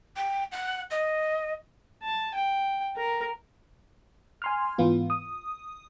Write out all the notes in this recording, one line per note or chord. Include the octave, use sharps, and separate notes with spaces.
G5
F#5
D#5
A5
G5
A#4
G#5 C6 F6
G#2 E3 B3 F4
D#6